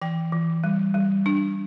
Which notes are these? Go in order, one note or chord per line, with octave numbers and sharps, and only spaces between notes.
E3 G5
E3
G3
G3
D4